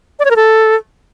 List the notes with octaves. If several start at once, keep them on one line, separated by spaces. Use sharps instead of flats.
D5
C#5
A#4
A4